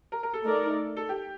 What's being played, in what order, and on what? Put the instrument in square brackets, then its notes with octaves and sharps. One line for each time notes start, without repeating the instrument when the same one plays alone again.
[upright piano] A#4
A#4
A4
[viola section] A3 D#4 A#4 D5
[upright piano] A4
G4